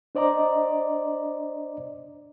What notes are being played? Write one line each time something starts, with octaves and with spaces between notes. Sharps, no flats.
D4 C5 D5 D#5 A#5 D6